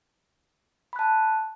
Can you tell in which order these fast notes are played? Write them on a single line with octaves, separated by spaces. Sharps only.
B5 F#6 A5